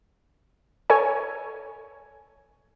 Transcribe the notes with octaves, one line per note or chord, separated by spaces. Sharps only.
A4 C#5 G#5